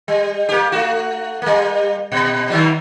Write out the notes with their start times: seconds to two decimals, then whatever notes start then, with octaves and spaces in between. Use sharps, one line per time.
0.08 G3
0.49 A#3 G4
0.72 A3 F#4
1.42 G3 A#3
2.12 A#2
2.50 D#3 F#3 G3